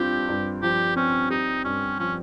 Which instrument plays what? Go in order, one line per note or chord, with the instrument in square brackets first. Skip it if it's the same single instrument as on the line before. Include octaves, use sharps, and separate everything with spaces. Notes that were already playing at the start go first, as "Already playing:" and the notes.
Already playing: [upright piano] G2 C4 F4 [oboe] G4
[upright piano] G2
[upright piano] F3 [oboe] G4
[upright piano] C4 [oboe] C#4
[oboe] D#4 [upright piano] G4
[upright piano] G2 [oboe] C#4
[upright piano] F3 [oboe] C#4